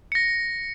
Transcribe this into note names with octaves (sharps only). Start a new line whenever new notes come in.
A#6 C#7